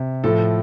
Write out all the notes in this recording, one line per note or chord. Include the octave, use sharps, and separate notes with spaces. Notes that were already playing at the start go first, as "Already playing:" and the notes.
Already playing: C3
A2 F3 A4